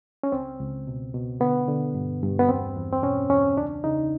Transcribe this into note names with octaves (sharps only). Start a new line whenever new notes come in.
C#4
C#2 C4
C#2
B2
B2
D3 B3
D3
G2
G2
B3
E2 C4
E2
C4
B2 C#4
E2 C#4
C#2 D4
C#3 D#4